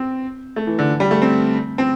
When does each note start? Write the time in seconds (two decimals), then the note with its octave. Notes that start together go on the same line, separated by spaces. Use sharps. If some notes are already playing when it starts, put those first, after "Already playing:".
Already playing: C4
0.56 A3
0.67 E3
0.79 D3
0.89 E3
1.00 G3
1.11 A3
1.22 C4
1.78 C4